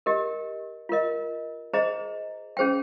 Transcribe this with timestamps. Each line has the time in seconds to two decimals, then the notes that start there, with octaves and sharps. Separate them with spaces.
0.06 G4 A#4 D#5
0.89 F4 A#4 D#5
1.73 G#4 C5 D#5 A#5
2.57 C#4 G#4 C5 G5